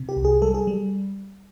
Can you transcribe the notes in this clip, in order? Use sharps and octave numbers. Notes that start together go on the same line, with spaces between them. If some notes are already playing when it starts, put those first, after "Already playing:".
Already playing: C3
G4
C2
G#4
G3 A4
G#4
G3